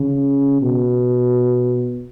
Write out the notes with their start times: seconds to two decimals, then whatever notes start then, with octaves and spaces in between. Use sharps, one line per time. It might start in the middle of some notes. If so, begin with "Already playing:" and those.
Already playing: C#3
0.62 B2